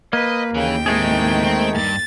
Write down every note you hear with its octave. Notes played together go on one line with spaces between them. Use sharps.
A#3 B4 D#5
D#2 C#3 E3 G5
A2 D#3 G#3 A3 C4 G#4
C4
E2 G2 A6